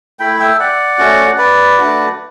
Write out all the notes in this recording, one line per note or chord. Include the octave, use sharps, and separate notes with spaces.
A3 E4 G5 B5
E5 G5
D5 F#5
A3 C#4 F#4
B4 D5
A3 D4 F#4